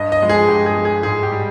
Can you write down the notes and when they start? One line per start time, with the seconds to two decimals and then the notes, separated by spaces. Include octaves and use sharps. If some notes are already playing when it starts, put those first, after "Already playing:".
Already playing: G2 D#5
0.12 D#5
0.21 F3 G#3
0.29 G#4
0.48 G2 G4
0.66 G#4
0.76 F3 G#3
0.85 G#4
1.03 G#2 G#4
1.23 G4
1.31 G3